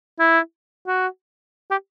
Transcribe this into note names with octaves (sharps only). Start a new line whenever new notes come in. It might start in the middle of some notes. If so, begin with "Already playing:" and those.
E4
F#4
G4